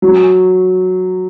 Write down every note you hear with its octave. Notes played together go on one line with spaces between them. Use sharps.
F#3